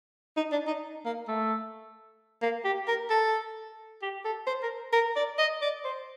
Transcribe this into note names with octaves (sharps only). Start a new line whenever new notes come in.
D#4
D4
D#4
A#3
A3
A#3
G4
A#4
A4
G4
A4
C5
A#4
A#4
D5
D#5
D5
C5